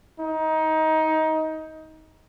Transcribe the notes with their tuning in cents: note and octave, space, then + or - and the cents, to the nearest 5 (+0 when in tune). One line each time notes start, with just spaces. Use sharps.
D#4 +20